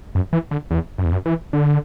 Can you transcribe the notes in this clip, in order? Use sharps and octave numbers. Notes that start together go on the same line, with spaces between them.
F#2
E3
D3
E2
F#2
E2
F#2
E3
D3